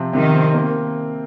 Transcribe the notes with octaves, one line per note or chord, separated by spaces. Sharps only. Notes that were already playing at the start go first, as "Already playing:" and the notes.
Already playing: C3 F3 C4
C3 D#3
C4
A#3